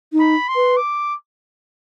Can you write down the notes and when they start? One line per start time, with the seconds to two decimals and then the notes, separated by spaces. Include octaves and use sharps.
0.13 D#4
0.20 B5
0.48 C6
0.56 B4
0.77 D6